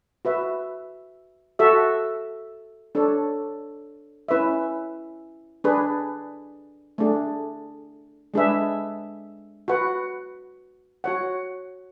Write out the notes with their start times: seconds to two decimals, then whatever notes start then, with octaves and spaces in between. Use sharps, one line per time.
0.25 F#4 B4 E5
1.59 F#4 A4 E5
2.95 D4 A4 C#5
4.28 C#4 E4 B4 E5
5.64 D4 G#4 B4
6.98 A3 D4 G#4
8.34 G#3 D4 G#4 B4 E5
9.68 F#4 B4 F#5
11.04 F#4 C#5 F#5